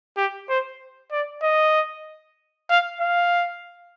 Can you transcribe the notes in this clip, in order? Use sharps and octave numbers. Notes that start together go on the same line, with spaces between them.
G4
C5
D5
D#5
F5
F5